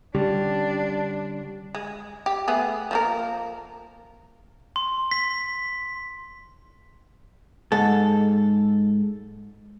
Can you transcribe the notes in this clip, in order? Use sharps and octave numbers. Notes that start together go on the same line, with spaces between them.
D3 G3 C#4 D4 G4
G#3
G4
A3 B3 G#4
F3 A#3 A#4
C6
B6
G#2 A4